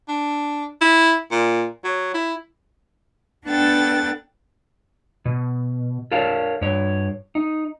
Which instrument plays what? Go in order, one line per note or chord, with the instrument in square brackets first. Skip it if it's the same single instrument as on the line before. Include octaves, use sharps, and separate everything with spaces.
[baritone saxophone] D4
E4
A#2
F#3
E4
[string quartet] B3 D4 A4 F#5 G5 A6
[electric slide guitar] B2
A4 A#4 C#5 F5
G2 C#5
D#4